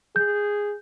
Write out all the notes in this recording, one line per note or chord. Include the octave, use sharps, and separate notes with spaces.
G#4 G6